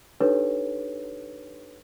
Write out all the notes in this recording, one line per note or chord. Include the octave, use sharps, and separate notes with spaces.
D4 D#4 G4 A4 B4 C#5